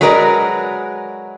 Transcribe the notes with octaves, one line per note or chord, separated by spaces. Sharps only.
F#3 G#3 F#4 A#4 B4 D5